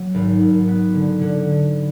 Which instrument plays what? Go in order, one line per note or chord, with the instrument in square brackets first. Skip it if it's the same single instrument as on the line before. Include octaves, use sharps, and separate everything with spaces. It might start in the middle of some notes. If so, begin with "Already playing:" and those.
Already playing: [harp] F#3
G#1
G#1
B3
D3
D3